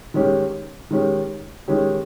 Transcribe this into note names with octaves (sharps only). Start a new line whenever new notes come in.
D#3 G#3 C#4 G4
D#3 G#3 C#4 G4
D#3 G#3 C#4 G4